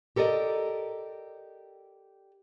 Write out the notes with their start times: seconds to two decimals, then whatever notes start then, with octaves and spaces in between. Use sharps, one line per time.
0.16 G4 A4 A#4 D5 D#5